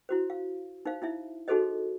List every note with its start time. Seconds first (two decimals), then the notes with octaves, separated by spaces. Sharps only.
0.09 E4 F#4 C5
0.30 F5
0.86 D#4 C5 F5
1.02 D#4 E4 E5
1.48 D#4 F#4 G#4 A4 C5 D#5